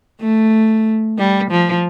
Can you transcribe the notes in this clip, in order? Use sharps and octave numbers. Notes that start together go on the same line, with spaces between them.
A3
G3
F3